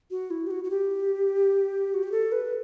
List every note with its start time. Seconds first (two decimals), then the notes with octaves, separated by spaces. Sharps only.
0.11 F#4
0.31 E4
0.47 G4
0.51 F#4
0.64 F#4
0.70 G4
1.94 F#4
2.03 G4
2.12 A4
2.32 B4